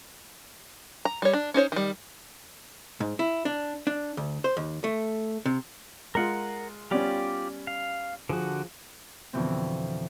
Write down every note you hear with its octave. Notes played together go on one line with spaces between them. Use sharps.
A#5
G3 C#5
D4
C#4 D#4 C5 C#5
D#3 G3
G#2
E4
D4
D4
D2
C5
D#2
A3
C3
G#3 F4 A#4 F#5
G3 B3 C#4 F4 G4 D5
F5
D3 F3 F#4 G#4
F2 B2 D3 E3 F3 C4